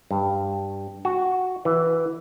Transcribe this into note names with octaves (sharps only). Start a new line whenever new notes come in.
G2
F#4
E3